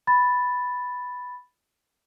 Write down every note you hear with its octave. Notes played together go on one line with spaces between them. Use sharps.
B5 A6